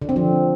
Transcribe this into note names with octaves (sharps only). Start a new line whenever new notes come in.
D3
C4
F3